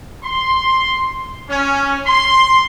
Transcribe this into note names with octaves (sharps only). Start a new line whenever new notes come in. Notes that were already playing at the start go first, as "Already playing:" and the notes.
C6
C#4
C6